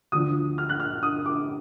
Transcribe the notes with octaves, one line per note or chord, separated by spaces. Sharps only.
D2 D3 F3 D#6
F6
F#6
F6
D#6
D6